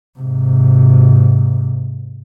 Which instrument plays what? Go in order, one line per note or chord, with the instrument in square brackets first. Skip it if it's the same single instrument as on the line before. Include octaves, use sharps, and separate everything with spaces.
[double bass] G#2 C3